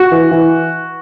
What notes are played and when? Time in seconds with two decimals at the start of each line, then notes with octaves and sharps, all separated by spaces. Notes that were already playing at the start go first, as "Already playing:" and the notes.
Already playing: F#4
0.11 E3
0.31 E3